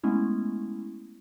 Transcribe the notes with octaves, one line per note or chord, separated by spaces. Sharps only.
G#3 A3 B3 C#4 E4